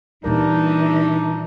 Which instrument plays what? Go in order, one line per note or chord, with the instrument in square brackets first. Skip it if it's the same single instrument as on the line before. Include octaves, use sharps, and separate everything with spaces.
[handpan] A#2 G3 A#4 [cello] E3 [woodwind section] D4 D#4